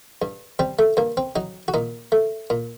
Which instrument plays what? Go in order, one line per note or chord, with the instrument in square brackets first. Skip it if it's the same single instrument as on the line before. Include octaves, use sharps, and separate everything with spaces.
[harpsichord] G2
G3 C4
A3
G2 A#3
C4
F#3 D#4
F#4
A#2 D#4
A3
A#2